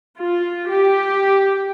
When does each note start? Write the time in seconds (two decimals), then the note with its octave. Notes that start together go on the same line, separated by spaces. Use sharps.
0.20 F4
0.68 G4